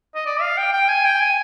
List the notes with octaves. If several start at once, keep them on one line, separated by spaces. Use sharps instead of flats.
D#5
D5
F5
G5
G5
G#5
G5
G#5